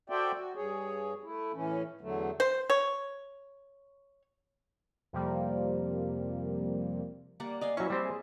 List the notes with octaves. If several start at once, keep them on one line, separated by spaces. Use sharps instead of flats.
F#4 A4 C5 D5 E5 G5
F#4
G2 G#4 C#5
A3 E4
A2 E3 C#4
E2 D3 F#3 A3
C5
C#5
F2 C3 F3 G3 A#3
G3 A#3 D5 F#5
D5 D#5 F5 G#5
F#3 C#4 E4 E5 C#6
G3 C4 C5
G#4